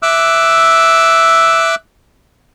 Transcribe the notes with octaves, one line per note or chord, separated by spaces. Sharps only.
E5 D6 E6 F#6